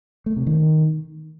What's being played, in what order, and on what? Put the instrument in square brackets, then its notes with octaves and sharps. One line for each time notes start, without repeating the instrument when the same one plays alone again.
[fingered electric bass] A3
C3
D#3